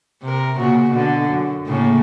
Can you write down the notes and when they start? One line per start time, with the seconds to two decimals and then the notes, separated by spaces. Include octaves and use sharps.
0.22 C3 A#4
0.57 A#2 C#3 F#4
0.90 B2 D3
1.29 F#2
1.66 A2 C#3 A#3